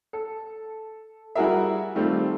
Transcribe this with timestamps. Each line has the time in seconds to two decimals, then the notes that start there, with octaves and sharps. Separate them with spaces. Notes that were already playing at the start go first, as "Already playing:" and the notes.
0.13 A4
1.35 G3 E4 F#4 G#4 A#4 E5
1.95 D#3 G3 A3 C4 F4